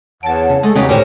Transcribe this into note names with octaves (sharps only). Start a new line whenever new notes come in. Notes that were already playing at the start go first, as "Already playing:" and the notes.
E2 C#5 F#5 A5 A6 D7
C#3
G#3 A3
E2 C#3 F#3 D#4 G4 G#5
D2 A2 D3 C#4 G4 A#4 C5